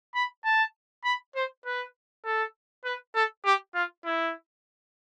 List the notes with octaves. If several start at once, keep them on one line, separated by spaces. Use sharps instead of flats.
B5
A5
B5
C5
B4
A4
B4
A4
G4
F4
E4